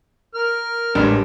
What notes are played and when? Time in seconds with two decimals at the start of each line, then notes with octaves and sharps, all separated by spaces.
0.35 A#4 F6
0.95 A1 G#2 G3 D4